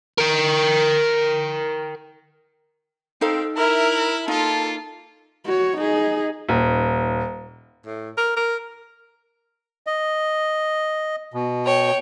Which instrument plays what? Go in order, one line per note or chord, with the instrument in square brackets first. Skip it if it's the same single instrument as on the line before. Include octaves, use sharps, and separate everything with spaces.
[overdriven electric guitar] A#4 G5
[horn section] C4 [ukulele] D#4 A4 F5
[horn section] E4 [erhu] A#4
[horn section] A#3 F4 [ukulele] D#4 [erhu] A4
[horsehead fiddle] F#4 C#5
D#4 G#4
[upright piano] D#1
[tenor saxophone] A2
A#4
A#4
[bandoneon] D#5
B2
[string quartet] C#5 G5